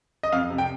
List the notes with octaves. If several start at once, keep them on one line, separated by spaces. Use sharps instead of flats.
D#5
F2 F5
C3
G5